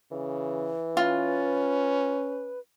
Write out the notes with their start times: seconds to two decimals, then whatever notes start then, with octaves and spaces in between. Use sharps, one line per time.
0.12 C#3 E3
0.97 C#4 F4 B4